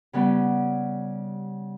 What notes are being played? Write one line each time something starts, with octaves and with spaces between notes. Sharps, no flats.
C#3 G3 B3 C#4